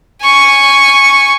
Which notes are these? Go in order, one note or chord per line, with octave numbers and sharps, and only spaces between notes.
G#5 C#6